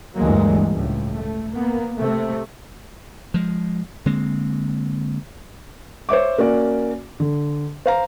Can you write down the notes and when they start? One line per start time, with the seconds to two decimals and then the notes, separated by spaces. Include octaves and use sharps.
0.17 D2 G2 E3 F#3 G#3 A#3
0.70 C#2 A2
1.11 A3
1.53 A#3 B3
1.97 C3 A3
3.34 F3 G#3
4.06 D3 G#3 A#3 C4
6.09 C5 C#5 E5 D6
6.38 A#3 C#4 F#4 D5
7.20 D3
7.86 C5 F5 A#5